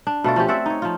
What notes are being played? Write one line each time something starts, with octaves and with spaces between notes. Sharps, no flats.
D4
B2 A3 F4 D5
F3 C#4 F4 G4
C4 D5 E5 F#5
D#4 C#5
F3 F4